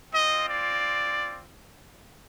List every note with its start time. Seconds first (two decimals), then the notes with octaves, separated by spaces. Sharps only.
0.13 C4 F4 D#5
0.47 D5